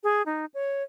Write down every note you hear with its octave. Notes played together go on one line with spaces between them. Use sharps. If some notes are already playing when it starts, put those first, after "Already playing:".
G#4
D#4
C#5